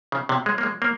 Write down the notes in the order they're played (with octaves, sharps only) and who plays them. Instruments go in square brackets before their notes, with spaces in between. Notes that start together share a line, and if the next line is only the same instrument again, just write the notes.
[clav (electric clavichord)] C#3
C3
G#3
A#3
G#3
A#3